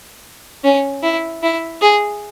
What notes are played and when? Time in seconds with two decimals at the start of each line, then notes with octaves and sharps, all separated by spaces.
0.64 C#4
1.03 E4
1.43 E4
1.82 G#4